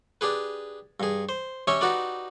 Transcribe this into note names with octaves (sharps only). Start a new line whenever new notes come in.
D4 G4 G#4 B4
G2 G#4
C5
C#4 G4 C#5 D#5 E5
D#4 F#4 G4 B4 D5